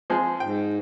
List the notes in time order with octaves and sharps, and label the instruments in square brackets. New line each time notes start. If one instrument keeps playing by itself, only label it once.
[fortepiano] F3 G#3 C4
[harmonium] G#2 [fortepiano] G5